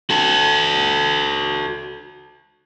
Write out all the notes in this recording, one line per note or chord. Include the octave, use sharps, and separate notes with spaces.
F#4 A4